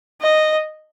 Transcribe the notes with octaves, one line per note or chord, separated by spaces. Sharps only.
D#5